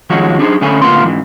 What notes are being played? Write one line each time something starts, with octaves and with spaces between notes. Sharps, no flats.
D#3 F3 G#3 C#4 F#4 C#5
D4 D#4 G#4 C5
A2 D3 C#4 E4 A4 G#5
D2 A2 A#3 B3 F4 C6
G#2 E3